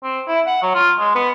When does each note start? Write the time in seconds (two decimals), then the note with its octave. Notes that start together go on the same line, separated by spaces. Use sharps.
0.04 C4
0.28 E4
0.47 F#5
0.62 F#3
0.75 F4
0.99 G#3
1.15 B3